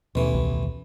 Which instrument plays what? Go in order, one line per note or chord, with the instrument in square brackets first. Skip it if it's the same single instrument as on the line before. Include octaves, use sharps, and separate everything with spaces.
[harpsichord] A1 E3 [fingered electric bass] D#2 B2
[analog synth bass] C2